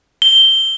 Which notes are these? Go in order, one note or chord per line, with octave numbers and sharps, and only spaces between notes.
G7